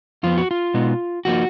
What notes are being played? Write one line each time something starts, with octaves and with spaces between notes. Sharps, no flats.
F2 F3 B3 F4
F#4
F4
B2 G#3 B3 D#4
F3 A#3 D#4 F#4